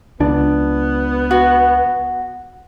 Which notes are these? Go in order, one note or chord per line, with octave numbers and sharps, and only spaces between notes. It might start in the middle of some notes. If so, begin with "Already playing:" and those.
C#2 B3 D4
F#4